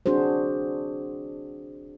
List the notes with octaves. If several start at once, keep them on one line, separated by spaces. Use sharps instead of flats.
C4 D4 F#4 G#4 C5